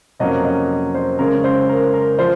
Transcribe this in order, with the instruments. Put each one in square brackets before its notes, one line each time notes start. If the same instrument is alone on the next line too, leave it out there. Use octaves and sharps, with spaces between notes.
[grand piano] F2 C3 F#3 A#3 C#4 D#5
D#5
C5
C#3 G#3 C#4 A#4
C5
A#4
A#4
F3 C5